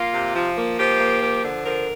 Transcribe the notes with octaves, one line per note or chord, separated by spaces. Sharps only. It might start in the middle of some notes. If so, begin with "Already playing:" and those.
Already playing: A#3 F4
C3
F3
A#3
F3 G4
A#3
F3
D3
F3 A#4